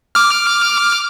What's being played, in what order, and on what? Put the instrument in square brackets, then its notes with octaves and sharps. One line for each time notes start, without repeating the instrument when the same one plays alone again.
[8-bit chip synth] D6 F6